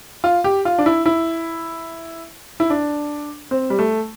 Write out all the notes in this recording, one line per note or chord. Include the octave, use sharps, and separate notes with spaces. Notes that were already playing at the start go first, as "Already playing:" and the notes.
F4
G4
F4
D4
E4
E4
E4
D4
C4
G3
A3